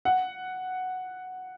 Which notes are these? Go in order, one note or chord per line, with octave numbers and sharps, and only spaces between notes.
F#5